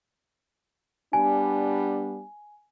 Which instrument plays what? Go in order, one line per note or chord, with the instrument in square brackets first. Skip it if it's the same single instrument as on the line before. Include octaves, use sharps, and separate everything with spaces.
[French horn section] G3 B3 D4 [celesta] G#5